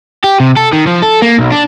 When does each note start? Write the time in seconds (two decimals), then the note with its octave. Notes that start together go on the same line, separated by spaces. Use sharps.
0.24 G4
0.40 C3
0.57 A4
0.73 D#3
0.87 F3
1.03 A4
1.22 A#3
1.39 B1
1.52 D4